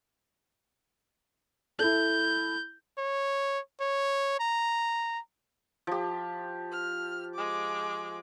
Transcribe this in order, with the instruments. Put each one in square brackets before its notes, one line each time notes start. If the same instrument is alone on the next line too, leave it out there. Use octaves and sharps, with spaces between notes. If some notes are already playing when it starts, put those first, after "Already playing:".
[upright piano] E4 A4 [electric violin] G6
[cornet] C#5
C#5
A#5
[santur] F3 G4
[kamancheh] F6
G#3 D6